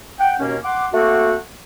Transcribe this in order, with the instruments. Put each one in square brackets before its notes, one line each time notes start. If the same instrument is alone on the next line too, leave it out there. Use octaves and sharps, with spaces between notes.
[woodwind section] F#5 G5
D#2 B2 A#3 C#4
F#5 C6 D6
A3 A#3 C4 F#4